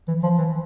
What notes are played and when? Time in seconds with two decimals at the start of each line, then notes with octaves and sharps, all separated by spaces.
0.08 E3
0.23 F3
0.38 E3